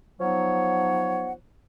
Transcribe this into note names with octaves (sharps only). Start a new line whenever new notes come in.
F3 F#3 B3 D#4 C#5 F#5